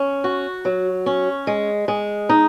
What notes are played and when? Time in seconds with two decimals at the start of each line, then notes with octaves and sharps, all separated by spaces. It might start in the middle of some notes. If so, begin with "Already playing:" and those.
Already playing: C#4
0.24 F#4
0.65 F#3
1.06 C#4
1.47 G#3
1.88 G#3
2.29 D#4